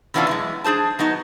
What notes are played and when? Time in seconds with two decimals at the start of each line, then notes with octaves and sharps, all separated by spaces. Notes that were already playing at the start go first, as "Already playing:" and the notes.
0.14 C3 E3 B3 C#4 D4 F4
0.27 F#2 E3 G#3
0.64 D4 G#4 C5 A5
0.99 F#3 B3 D#4 F#4